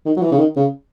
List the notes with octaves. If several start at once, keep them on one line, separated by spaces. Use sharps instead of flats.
D#3
F#3
E3
C#3
D#3
C#3